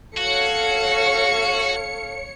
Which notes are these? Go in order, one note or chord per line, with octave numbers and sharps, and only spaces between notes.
F#4 A4 C#5 F5 C#7